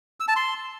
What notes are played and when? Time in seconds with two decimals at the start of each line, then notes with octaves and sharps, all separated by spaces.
0.20 E6
0.28 A5
0.36 C6